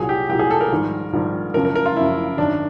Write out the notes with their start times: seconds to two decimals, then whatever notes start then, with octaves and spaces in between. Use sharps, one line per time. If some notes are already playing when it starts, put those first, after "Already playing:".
Already playing: C2 A#2 F#3 G#4
0.09 G4
0.29 C2 A#2 F#3 G4
0.39 G#4
0.51 A4
0.61 A#4
0.71 A#1 G#2 D#3 G3
1.13 A#1 G#2 D#3 G3
1.54 F#1 F#2 C#3 F3 A#4
1.65 A#4
1.75 A#4
1.86 F4
1.96 F#1 F#2 C#3 F3 E4
2.38 G#1 F#2 D#3 D4